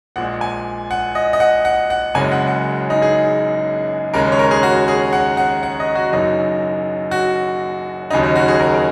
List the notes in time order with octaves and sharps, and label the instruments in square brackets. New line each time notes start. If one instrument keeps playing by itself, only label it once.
[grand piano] A#1 A#2 G#3 F#5
G#5
F#5
D#5
D#5
F#5
F#5
F#5
F#1 F#2 C#3 G#3 G#5
F#5
F#5
D#4
G#4
D#2 C#3 G#3 A#4
C#5
A#4
G#4
F#4
G#4
F#5
F#5
F#5
D#5
F#4
F#1 F#2 F#3 D#4
F#4
D#2 C#3 F#3 D#4
D#4
F#4
G#4
A#4
G#4
A#4